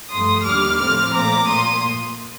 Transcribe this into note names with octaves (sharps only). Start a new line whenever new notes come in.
G2 F3 A3 C6 D#6
D#2 D3 G3 D6 F6
A2 F3 A3 C4 D6 F6
A#2 F3 A3 A#5 D6
A#2 C6 D#6